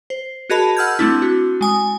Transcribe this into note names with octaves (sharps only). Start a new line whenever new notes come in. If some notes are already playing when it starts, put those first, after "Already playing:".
C5
F#4 G#4 A#4 D#5 A5 B5
F#5 E6 F6 G6 G#6
A3 C4 D4 E4
F#4
G#3 G#5 D#6